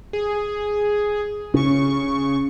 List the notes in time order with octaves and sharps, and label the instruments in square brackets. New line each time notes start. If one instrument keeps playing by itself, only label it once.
[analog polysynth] G#4
[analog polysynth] C#3 C#6 [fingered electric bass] C#4